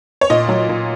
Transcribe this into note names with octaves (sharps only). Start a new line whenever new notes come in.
C#5
A#2 D#5
F#3
A#2